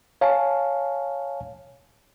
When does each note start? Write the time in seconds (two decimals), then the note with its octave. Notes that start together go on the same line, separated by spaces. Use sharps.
0.21 C#5 F5 G#5 A5